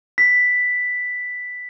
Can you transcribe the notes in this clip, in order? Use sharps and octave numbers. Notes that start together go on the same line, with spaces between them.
B6